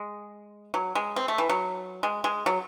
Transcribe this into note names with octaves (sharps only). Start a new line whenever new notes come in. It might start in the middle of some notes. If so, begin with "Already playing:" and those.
Already playing: G#3
F#3
G#3
C4
A3
E3
F#3
G#3
G#3
F#3